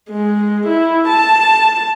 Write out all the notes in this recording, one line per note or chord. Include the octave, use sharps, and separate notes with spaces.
G#3
E4
A5